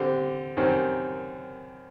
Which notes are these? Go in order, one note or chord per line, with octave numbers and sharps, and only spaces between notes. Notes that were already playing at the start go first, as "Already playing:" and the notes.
Already playing: D3 G3 C4
F#2 D#3 G3 C4